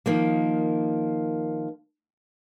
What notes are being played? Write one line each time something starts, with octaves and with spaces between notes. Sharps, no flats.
D#3 F3 A#3